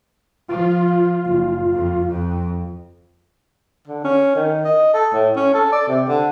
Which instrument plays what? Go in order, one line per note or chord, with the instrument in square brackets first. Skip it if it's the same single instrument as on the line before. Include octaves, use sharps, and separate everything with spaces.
[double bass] F3 [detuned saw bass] F4
[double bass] F#1
F2
F2
[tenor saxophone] D3
C#4
D#3
D#5
A4
A2
C#4
A4
D5
C3
D3